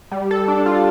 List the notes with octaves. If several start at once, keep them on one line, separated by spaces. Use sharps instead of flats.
G3
A4
D4
F4